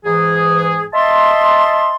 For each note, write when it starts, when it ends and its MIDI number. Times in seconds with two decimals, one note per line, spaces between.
0.05 0.85 44
0.05 0.85 52
0.05 0.85 68
0.94 1.96 75
0.94 1.96 76
0.94 1.96 81
0.94 1.96 84